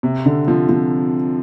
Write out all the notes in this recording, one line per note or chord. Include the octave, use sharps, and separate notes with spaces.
C3
D3
F3
F3